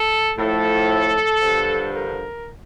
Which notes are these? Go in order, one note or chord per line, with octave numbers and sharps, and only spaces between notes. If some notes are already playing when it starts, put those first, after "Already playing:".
Already playing: A4
A2 F3 A4
G2 D3 F3
A#4